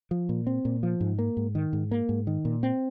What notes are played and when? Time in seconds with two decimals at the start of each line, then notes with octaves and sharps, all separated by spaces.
0.11 F3
0.29 A#2
0.47 C4
0.65 A#2
0.83 F3
1.01 G#2
1.19 A#3
1.37 G#2
1.55 D#3
1.73 G#2
1.91 A#3
2.09 G#2
2.27 D#3
2.45 A#2
2.63 C4